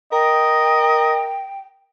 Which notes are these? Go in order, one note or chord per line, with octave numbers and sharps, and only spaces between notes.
A#4 D#5 G5